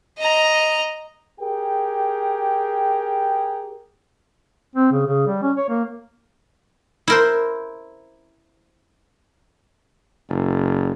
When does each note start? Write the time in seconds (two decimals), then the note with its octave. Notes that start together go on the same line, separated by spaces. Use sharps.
0.18 D#5 A#5
1.40 G4 G#4 A#4 G5
4.75 C4
4.92 C#3
5.06 C#3
5.27 G3
5.42 C#4
5.57 C#5
5.69 A#3
7.08 E4 A#4 C5
10.29 F#1